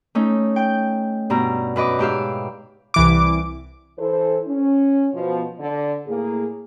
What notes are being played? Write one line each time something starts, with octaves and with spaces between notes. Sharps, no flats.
A3 C#4 D#4
G5 G6
G2 B2 A#5
F#2 B4 D#5 D6
G#2 G4 E5 F5
C2 E3 D6
E3 A4 C5
C#4
B2 F3
D3 D5
A2 A#3 G#4